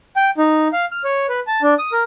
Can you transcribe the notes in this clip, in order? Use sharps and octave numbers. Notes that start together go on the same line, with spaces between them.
G5
D#4
F5
F6
C#5
B4
A5
D4
D#6
A#4